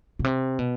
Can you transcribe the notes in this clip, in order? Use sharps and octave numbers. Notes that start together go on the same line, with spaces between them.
B2
C3
B2